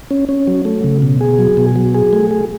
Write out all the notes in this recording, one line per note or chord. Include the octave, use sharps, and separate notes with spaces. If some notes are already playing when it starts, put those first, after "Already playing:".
C#4
C#4
F#3
A3
C#3
B2
G#4
F#3
B2
F#3
G#4
A3
G#4